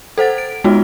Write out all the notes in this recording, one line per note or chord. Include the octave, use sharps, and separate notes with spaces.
A4 C5 F#5 A6
D7
G#3 B3 D#4 F4 F#4